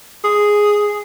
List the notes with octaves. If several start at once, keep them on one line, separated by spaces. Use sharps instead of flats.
G#4